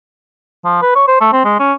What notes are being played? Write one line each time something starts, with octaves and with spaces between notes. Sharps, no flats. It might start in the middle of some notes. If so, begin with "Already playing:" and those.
F3
B4
C#5
C5
A3
C4
G#3
C#4